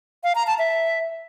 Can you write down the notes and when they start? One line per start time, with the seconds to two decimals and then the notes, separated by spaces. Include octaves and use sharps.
0.24 F5
0.35 A#5
0.47 A5
0.59 E5